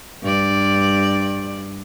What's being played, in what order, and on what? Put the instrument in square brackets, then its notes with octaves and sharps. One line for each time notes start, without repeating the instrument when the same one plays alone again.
[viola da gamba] G2 D5